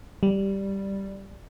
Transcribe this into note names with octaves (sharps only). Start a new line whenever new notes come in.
G3